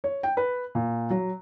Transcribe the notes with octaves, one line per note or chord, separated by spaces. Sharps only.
C#5
G5
B4
A#2
F#3